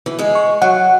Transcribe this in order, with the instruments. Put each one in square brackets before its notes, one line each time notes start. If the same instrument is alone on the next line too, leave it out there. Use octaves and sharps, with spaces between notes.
[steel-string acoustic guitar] E3
G#3 G#4
[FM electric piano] C#6
[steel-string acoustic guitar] F#3 [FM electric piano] F#5